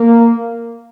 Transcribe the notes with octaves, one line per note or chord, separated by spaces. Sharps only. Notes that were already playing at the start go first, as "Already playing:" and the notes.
Already playing: A#3